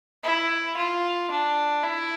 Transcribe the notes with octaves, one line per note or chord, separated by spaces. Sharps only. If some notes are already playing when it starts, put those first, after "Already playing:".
E4
F4
D4
E4